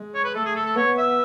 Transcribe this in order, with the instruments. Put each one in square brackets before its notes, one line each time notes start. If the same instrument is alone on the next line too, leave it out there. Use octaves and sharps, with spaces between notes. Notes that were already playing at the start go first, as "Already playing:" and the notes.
Already playing: [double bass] G#3
[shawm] C#5
B4
[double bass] A3 [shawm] A4
[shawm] G#4
A4
A4
[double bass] B3 [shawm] C#5
[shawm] E5